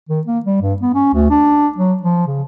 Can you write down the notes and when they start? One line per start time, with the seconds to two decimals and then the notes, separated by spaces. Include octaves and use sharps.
0.09 D#3
0.27 A#3
0.46 G3
0.62 G2
0.82 B3
0.95 C#4
1.14 D2
1.30 D4
1.78 F#3
2.03 F3
2.27 C#3